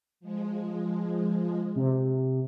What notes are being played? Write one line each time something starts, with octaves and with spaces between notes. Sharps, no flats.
F3 G#3
C3